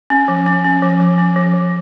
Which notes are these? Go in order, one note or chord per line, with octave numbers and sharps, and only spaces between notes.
C#4
F3
C#4
C#4
F3
F3
C#4
F3
F3